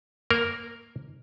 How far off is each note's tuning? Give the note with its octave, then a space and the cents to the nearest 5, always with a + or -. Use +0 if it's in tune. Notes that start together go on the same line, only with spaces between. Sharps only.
A#3 +0 A#4 -5